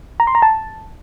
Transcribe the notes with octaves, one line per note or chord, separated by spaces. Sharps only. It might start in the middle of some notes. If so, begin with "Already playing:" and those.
A#5
C6
A#5
A5